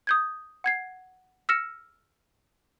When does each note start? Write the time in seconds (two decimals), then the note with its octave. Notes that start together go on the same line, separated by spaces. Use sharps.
0.07 D#6 G6 G#6
0.64 F#5 G#6 C7
1.49 E6 F6 A#6 C#7 E7